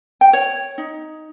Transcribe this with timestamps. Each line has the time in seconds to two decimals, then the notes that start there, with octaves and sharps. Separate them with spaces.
0.21 G5
0.33 C#5
0.78 D#4